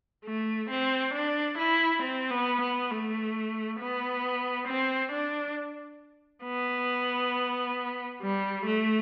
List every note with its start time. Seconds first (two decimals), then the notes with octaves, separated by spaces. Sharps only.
0.24 A3
0.70 C4
1.14 D4
1.58 E4
2.02 C4
2.31 B3
2.61 B3
2.90 A3
3.79 B3
4.67 C4
5.11 D4
6.44 B3
8.22 G3
8.66 A3